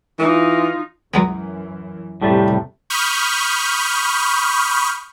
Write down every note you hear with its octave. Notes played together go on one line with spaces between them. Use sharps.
E3 D#4 F4
F#2 E3 F#3 G#3 B3
F2 A2 C3 G3 A3
B5 C#6 D#6 F6 G6